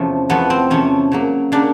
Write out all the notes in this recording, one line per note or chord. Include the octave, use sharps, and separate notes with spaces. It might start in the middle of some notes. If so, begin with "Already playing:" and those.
Already playing: E2 C3 F3 A3 C#4
E2 C3 F3 A3 B3
C4
E2 C3 F3 A3 C#4
C#3 F#3 A#3
C#3 F#3 A#3 D4